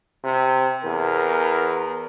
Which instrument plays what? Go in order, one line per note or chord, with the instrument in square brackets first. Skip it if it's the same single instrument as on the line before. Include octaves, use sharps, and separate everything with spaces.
[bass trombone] C3
[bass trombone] E2 [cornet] A#4